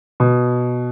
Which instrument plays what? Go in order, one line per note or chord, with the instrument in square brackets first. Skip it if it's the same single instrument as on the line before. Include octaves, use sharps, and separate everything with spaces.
[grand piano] B2